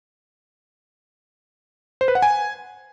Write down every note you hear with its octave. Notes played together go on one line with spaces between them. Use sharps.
C5
B4
F#5
G#5